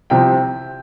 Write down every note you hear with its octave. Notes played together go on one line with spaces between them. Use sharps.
C2 C3 F3 C4 G5